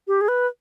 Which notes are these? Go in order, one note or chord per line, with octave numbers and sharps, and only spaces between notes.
G4
G#4
B4